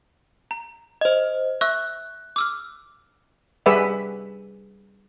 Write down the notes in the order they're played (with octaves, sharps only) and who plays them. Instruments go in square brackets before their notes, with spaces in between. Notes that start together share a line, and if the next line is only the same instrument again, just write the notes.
[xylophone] A#5
[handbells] C5 D#5
[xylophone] E5 C#6 E6 [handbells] F#6
[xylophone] D6 E6 F6
[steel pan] G3 G#4 B4 D5 E5 F#5